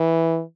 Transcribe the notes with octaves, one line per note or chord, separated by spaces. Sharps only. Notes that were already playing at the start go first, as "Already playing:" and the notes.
Already playing: E3